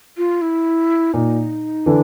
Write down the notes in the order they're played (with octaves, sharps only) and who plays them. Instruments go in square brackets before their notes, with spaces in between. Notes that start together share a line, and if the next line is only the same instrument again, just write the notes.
[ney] F4
E4
[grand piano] A#2 [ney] D#4
[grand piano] D3 E3 [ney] D4